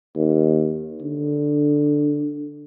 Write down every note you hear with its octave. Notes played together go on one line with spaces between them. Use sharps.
D#2
D3